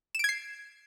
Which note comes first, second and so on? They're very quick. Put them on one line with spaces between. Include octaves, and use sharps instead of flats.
E7 D7 G#6 C7